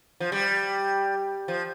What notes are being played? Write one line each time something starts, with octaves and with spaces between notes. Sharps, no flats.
F3
G3
F3